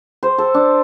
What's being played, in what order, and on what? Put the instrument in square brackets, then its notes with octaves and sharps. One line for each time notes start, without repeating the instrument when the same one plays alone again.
[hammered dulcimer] C5
A4
D4